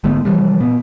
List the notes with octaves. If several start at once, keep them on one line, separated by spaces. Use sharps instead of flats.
G#1 D3 A3 B3
C3 E3 F3 G3
A#2 B3